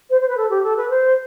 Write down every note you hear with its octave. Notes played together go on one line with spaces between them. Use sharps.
C5
C5
B4
A4
G4
A4
B4
C5